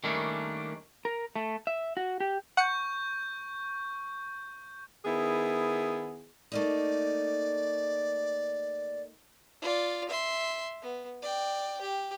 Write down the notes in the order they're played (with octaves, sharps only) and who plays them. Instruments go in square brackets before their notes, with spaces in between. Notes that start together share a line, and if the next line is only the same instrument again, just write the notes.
[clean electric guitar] D#3 G3 A3 A#3 C#4 D4
[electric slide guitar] A#4
A3
E5
F#4
G4
[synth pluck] F#5 C#7 [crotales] C#6 G6
[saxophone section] D#3 B3 E4 G#4
[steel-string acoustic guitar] A3 A#3 D#4 [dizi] D5
[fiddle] F4 D5
E5 C6
B3
D5 G5
G4